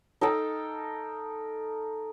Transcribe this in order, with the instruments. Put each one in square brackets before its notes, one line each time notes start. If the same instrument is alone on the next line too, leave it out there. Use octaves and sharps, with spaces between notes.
[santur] D#4 A4 F5 G5